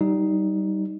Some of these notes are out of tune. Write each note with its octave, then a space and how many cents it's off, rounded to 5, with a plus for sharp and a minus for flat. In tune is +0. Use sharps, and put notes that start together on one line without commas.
G3 -20 D#4 +5